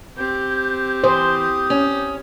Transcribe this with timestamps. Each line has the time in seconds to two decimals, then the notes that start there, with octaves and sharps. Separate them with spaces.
0.17 C4 G4 G6
1.04 E3 C5 D#6
1.70 C#4